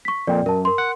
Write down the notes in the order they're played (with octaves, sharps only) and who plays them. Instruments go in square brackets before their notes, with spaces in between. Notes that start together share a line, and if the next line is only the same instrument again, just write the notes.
[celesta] C#6 B6
[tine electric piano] F2 A#2 [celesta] D5 G5
[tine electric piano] F#2 [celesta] A#4 A5
[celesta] A#4 C6
[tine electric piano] F#5